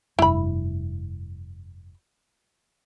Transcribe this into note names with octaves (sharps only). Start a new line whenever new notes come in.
F1 G2 E4 B5